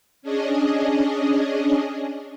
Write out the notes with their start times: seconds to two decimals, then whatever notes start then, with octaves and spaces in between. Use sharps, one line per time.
0.22 C#4 D4 G#4 D#5